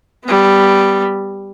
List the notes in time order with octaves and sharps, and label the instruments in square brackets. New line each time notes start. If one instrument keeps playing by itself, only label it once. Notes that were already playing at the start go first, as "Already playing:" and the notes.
[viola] G3 B3